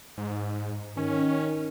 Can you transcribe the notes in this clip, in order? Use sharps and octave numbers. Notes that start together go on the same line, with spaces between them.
G#2
D#3 C#4